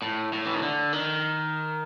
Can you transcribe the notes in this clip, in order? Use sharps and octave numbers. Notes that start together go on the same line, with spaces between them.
A2
A2
E3
D#3
D3
D#3